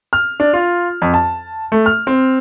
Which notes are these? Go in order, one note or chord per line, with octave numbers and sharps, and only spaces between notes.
F6
D4
F4
F2
A5
A3
F6
C4